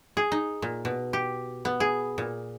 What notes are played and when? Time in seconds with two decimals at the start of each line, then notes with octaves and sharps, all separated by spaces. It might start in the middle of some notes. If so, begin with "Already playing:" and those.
0.17 G#4
0.32 D#4
0.62 A#2
0.85 B2
1.13 G4
1.65 B3
1.80 G#4
2.18 A#2